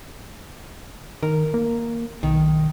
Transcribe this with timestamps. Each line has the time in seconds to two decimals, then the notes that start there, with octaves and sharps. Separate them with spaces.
1.23 D#3 A#4
1.54 A#3
2.23 B1 D#3